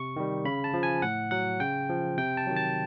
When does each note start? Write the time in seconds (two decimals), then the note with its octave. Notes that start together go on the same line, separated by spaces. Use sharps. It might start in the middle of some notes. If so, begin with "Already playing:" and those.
Already playing: C3 C#6
0.16 D#3 G3
0.45 C#3 B5
0.64 A5
0.74 F3
0.83 G#5
1.02 A2 F#5
1.31 F#3 F#5
1.60 C#3 G5
1.89 F3
2.18 C3 G5
2.37 A5
2.47 D#3 F#3
2.56 A5